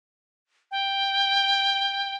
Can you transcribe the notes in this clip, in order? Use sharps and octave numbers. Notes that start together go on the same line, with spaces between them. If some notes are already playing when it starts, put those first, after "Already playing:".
G5